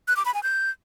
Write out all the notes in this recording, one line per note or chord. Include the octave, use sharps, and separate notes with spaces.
F#6
D6
B5
G#5
G6